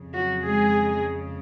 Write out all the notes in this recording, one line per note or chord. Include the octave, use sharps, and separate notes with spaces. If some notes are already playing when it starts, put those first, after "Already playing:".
Already playing: F2 C#3
F#3 F#4
G#3 G#4